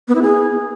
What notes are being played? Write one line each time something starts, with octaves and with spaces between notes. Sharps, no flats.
B3
E4
G#4